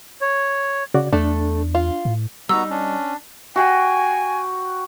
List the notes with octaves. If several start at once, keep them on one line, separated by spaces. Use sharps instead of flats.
C#5
C#3 F#4 D5
E2 A3 D4 A4
F4
A2
G3 B3 D#4 F#4 A#5 E6
C#4 D4
F#4 G5 G#5